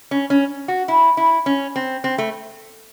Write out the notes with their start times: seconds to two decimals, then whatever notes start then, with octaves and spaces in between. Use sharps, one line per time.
0.11 C#4
0.30 C#4
0.68 F#4
0.88 E4
1.17 E4
1.46 C#4
1.76 C4
2.04 C4
2.18 A3